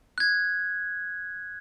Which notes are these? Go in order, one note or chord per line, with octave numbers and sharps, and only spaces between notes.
F#6 G#6